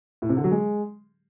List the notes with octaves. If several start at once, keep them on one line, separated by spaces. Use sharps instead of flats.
A2
C3
D3
F#3
G#3